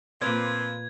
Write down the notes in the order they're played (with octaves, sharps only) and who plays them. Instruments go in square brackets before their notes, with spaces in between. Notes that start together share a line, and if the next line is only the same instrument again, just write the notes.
[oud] A#2 D5 [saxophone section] F3 A#3 C4 [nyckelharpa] B4 [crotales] G#6